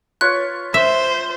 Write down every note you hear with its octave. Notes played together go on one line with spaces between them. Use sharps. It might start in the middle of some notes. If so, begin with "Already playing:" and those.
F4 B4 C#5 F#6
C5 E5